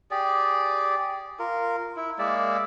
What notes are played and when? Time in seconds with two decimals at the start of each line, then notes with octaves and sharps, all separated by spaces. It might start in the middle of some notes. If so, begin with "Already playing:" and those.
0.11 G4 G#4 D5
1.39 F4 A#4
1.97 E4
2.19 G#3 A#3 D5 E5